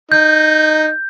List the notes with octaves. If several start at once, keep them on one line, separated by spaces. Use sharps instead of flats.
D#4 G6